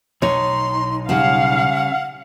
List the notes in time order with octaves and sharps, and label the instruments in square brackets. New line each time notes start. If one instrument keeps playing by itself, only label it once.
[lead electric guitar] B1 D#4 [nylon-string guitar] C#5 [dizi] C6
[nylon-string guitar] C#3 G3 [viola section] F5 [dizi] F#5